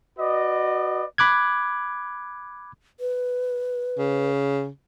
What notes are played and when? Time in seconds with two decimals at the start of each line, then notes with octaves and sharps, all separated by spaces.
0.19 F#4 B4 D5 D#5
1.18 B5 D6 F#6 G#6
3.00 B4
3.99 C#3